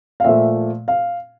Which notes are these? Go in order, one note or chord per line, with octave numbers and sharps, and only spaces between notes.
F5
A#2 F3 A3 E5
F5